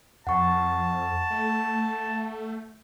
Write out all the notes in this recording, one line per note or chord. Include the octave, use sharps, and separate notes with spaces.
F2 F#5 A5 C#6
A3